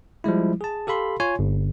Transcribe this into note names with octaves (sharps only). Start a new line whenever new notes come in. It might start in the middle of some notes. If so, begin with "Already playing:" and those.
F3 G3 G#3 E4
G#4 A5
G4 A4 F5 B5 C6
F4 C#5 G#5 C6
G1